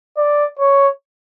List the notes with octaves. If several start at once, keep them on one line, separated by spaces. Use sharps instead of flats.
D5
C#5